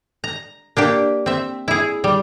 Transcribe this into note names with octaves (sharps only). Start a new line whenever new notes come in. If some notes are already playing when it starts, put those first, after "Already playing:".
A#5
A#3 D4 G4
C4 E5
E4 G#4
G3